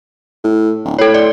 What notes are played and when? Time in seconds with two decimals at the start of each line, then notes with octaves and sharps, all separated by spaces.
0.44 A2
0.85 D1
0.98 A2 A4 C#5
1.14 D5